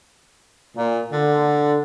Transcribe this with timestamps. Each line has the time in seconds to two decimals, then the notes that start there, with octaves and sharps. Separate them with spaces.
0.77 A#2
1.13 D3